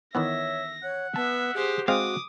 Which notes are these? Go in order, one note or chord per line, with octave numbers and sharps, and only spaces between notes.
D#3 E3 B3 C#5 E5 A#6
C#5 F#5
B3 E5 A5
G4 G#4 C5
G#3 C4 F#4 F5 D6 D#6